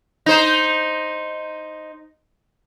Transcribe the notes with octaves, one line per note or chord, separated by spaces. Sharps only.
D#4 C5